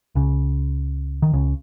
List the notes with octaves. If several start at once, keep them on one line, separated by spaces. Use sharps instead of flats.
C#2 C#3
D#3
C#2 C#3